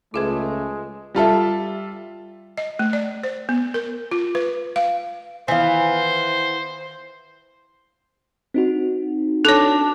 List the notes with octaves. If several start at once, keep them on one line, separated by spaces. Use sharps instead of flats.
C#2 G#3 A3 F4 G#4 B4
G3 F4 A4 E5
D#5
A3
D5
C5
B3
A#4
F4
B4
F5
D#3 E3 B3 C5 F5
C4 D#4 F#4
D4 A4 C#5